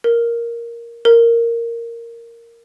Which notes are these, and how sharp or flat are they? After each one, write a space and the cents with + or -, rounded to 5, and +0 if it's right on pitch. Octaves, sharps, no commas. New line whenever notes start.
A#4 +5
A#4 -5